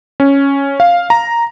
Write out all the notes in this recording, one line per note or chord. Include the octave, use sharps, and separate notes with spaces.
C#4
F5
A#5